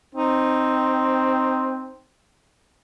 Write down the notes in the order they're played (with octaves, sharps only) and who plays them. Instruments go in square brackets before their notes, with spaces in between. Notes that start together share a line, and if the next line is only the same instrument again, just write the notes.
[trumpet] C4 [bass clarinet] D#4